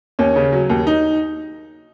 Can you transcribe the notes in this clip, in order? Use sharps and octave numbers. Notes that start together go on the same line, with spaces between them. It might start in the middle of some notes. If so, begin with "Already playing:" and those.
D#2 C#4
C#3
F#3
D#2
D#4